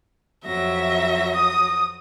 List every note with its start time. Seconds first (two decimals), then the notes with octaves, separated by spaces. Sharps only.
0.46 F2 F#3 E5 A#6
1.36 D#6